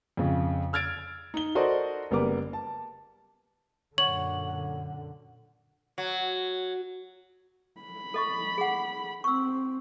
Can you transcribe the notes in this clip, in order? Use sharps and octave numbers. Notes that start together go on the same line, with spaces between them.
F2 C#3
E6 F6 G#6 A6 D7
D#4 G7
F#4 A4 A#4 C5 D5 D#5
F#1 G3 B3 A#4 D6
A5
F#2 A#2 D3 C#5 F#5 F#7
F#3
B5
A4 D#5 C#6
G#4 F#5
C4 C#6 E6